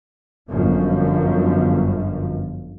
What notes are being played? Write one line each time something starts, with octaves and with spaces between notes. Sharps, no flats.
G1 F#2 F3